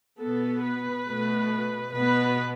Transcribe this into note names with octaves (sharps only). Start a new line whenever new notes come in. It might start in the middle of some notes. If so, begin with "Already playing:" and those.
B2 B3 A4
B4
B2 A3
B2 B3 B4